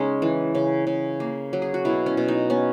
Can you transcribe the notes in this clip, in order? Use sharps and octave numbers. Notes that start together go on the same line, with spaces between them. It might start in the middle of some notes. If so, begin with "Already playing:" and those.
Already playing: C#3 G#3 B3 C#4 D#4
E3
C#3
C#3
A#3
F#3
G#4
F#4
B2 E4
C#4
B2
D#4
B3 C#4